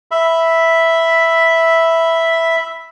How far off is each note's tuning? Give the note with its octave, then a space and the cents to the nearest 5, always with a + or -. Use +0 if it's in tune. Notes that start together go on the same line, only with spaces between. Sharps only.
E5 +0 B5 +0